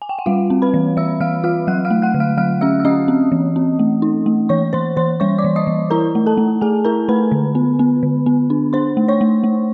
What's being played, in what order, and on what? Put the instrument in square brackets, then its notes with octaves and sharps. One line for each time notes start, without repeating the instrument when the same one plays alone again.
[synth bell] G#5
G5
F#5
G3 F4 F5
C4
B4 B5
E3
E3 E5 E6
E3 F5 F6
F4 F5 F6
F#3 F#5 F#6
F5 F6
A3
F#5 F#6
D3
F5 F6
F#3 F5 F6
C#4 E5 E6
E6
C#4 D#5 D#6
C4
E3
C4
A3
D#4
A3
E3 C#5 C#6
E3 C5 C6
E3 C5 C6
G3 C#5 C#6
D5 D6
E3
D#5 D#6
E3
E4 A#4 A#5
A3
A4 A5
A3
A3 G#4 G#5
E4 A#4 A#5
A3 B4 B5
D3
B3
B3
D3
B3
D4
D4 C5 C6
A3
C#5 C#6
A3
A3